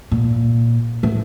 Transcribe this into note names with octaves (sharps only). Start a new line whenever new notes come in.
A#2
A2